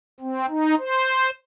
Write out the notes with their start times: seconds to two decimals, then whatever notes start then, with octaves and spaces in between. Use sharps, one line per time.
0.20 C4
0.49 D#4
0.78 C5